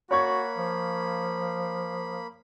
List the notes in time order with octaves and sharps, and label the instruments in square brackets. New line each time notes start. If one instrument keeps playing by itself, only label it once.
[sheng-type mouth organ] A#3 B5 [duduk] F#4 [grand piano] C#5 C#6 G#6
[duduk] F3